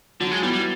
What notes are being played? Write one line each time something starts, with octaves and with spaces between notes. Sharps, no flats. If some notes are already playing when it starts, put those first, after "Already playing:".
D3 F#3
G#3
G3 B3 E4
G3